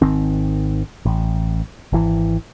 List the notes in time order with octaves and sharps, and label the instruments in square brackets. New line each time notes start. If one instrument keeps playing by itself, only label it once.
[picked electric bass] G#1 D#3 C4
A1
G#1 E3